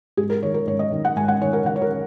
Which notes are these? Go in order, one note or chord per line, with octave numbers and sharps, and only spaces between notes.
G#2 G#4
A#4
D#3 C#5
A#4
G#2 C#5
D#5
D#3
F#5
G#2 G#5
F#5
D#3 C#5
A#4
D#3 F#5
C#5
A#4